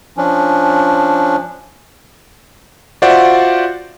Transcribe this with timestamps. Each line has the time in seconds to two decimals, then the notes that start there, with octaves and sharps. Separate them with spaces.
0.17 F3 C#4 D4
3.02 F4 F#4 C5 D5 E5 F#5